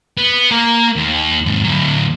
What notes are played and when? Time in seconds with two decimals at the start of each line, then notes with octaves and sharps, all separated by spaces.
0.18 B3
0.51 A#3 A#4
0.96 D#2
1.45 D#2 G#2
1.64 D2 F#3